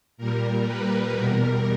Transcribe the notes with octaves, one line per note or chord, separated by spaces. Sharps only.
A#2 G3 A#4
B4
E2 B2 G3 A#4